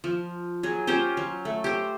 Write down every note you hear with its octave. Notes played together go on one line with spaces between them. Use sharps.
F3
F#3 G#4
C#4 F4 G4 C5
F#3
A3
G4 C5